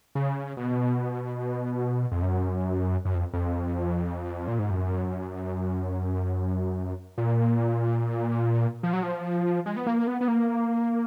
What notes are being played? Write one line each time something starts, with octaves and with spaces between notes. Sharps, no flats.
C#3
B2
F2
F#2
F#2
F2
F2
A#2
G#2
F#2
A#2
F3
F#3
F3
G#3
B3
A#3
B3
B3
A#3